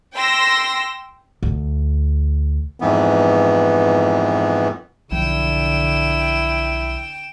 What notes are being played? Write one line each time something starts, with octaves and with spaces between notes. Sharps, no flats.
G5 C6 E6 A#6
D2
F2 G#2 E3 B3
B1 D3 F3 E4 G5 E7